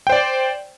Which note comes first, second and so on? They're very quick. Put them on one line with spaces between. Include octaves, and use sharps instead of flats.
G5 C5 D5